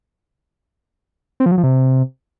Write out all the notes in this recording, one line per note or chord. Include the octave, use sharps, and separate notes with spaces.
C4
F3
F#3
F3
C3